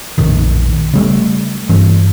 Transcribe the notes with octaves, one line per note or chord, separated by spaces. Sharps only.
A#1 F2 A2 D#3
C#3 G3 A3
G2 E3 C4